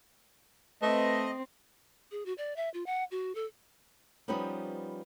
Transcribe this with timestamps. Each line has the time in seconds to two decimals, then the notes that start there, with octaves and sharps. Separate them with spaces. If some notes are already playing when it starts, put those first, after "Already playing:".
0.82 A3 C4 B4 D#5
2.11 G#4
2.26 F#4
2.38 D5
2.56 E5
2.74 F4
2.86 F#5
3.11 F#4
3.35 A4
4.28 F3 G3 B3 C#4 D#4 B4